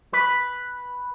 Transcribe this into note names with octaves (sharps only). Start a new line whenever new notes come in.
B4